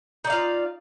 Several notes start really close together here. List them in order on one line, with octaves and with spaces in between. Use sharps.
D#4 D5 F5 F4